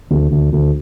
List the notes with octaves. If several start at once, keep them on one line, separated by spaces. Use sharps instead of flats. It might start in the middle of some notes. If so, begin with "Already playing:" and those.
D2
D2
D2